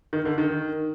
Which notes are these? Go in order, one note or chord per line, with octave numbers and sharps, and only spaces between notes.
D#3
D3
D#3